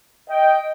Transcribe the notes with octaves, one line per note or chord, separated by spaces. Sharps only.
D#5 G5